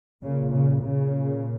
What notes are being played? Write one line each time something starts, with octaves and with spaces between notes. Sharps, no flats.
A#2 C#3
C#3
C#3
A#2